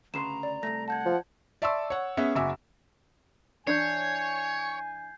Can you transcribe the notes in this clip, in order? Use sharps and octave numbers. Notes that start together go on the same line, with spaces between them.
D2 C#3 B4 A#5 C6 C7 E7
D5
C2 F#2 A3 A#6
F#5 A5 G6 G#6
F3
D5 E5 A5 C6 C#6 E6
C#5 F#5
B3 C#4 G#4 E5
F#1 F#4 E5 G#5 D6 E6
E3 D4 C#5 G#5 G6 G#6 C7